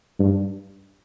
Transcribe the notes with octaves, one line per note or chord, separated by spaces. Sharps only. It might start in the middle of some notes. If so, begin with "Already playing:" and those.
G2